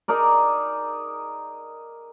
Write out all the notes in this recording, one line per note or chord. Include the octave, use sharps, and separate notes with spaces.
D#4 G#4 A#4 D5